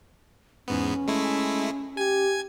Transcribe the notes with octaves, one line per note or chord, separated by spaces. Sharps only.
E2 G#2 B3 C#4
G#3 A3 E4
G4 G#5 G#6